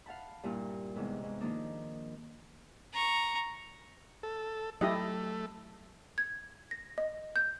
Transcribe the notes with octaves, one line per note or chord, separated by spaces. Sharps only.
F5 F#5 A5 B5
G2 A#2 E4 F4
E2 G#2 C3
E2 G#2
D#3 F3 A#3 D4 D#4
A#5 C#6
A4
F#3 A3 E4 G4 D#5
G#6
A#6
D#5
G6